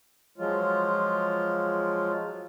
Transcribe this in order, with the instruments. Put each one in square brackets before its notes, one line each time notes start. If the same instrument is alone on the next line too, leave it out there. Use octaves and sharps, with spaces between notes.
[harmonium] F3 F#3 G#3 F4